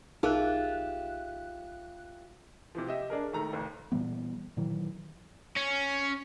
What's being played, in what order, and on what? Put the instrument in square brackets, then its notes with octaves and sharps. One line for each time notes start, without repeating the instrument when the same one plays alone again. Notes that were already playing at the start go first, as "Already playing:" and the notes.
[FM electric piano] B1 F#6 [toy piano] D#4 G#4 A#4 [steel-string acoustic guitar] F4 G4 E5
[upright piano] C3 E3 F3
G4 D#5 E5
D4 G#4 A#4
E1 D#3 A3 A#5
F1 D#2
[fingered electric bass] A#2 E3 G3 B3
A#2 D#3 E3 F#3
[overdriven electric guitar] C#4